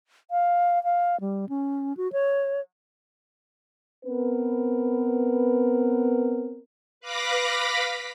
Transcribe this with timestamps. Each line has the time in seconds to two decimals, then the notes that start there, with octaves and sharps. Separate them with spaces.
0.31 F5
0.84 F5
1.20 G3
1.49 C#4
1.97 F#4
2.13 C#5
4.05 B3 C4 A#4 B4
7.01 B4 F5 B5 D6 A#6 B6